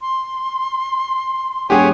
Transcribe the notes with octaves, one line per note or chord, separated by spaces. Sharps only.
C6
E1 G4 G#4 C#5 F#5 G#5